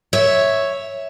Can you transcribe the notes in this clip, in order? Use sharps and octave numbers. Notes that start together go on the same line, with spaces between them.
C#5 E5